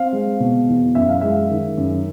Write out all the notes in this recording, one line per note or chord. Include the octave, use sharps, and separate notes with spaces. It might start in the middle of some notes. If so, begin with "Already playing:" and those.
Already playing: C4 F5
G#3
B2
E2
F#2 E5
F5
G#3 E5
D#3
F#2